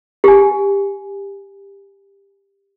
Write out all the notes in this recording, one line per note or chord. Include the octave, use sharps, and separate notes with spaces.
G4 G#5